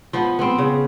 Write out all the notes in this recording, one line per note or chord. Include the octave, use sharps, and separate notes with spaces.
F3 B3
B3 C4
C#3